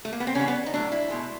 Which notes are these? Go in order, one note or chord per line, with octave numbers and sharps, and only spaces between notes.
A3
A#3
B3
C4
C#3 E3 G3 C#4
B3
D#4
A2 F#3 A3 D4
E4
B2 G#3